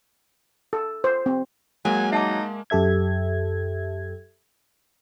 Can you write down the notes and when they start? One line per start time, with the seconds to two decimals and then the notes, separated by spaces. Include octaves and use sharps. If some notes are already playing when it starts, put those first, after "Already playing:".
0.73 A4
1.04 C5
1.26 C4
1.85 F#3 G#3 A#3 G#5
2.12 D#4 E5 A5 D6
2.70 F#2 G4 A4 E5 G#6